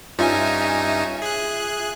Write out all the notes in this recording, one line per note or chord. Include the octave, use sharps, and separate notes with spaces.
G2 C#4 D#4 F4 E5 G#5
G#4 F#6